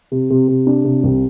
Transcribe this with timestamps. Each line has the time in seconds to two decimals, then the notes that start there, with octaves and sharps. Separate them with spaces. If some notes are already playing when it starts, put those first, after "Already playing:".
0.12 C3
0.30 C3
0.48 C3
0.67 D4
0.85 C3
1.03 C2